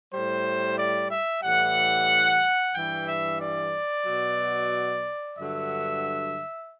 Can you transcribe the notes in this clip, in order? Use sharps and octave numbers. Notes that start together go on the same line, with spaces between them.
A2 G3 C5
D5
E5
A2 E3 G3 F#5
G2 E3 G3 G5
E5
D5
B2 F#3
G2 D3 F#3 E5